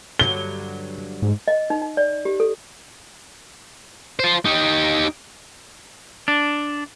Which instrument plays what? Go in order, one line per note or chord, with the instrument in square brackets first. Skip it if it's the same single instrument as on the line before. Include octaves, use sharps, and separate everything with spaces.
[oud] G2 D3 F#3 [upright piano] G7
[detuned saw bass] G#2
[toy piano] D#5
D#4
D#4
D5
G4
A4
[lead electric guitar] F4 C5
D#4 G4
[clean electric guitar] D4